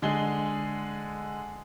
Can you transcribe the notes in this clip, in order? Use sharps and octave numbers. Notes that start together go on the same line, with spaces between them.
D3 G#3 G#4 G7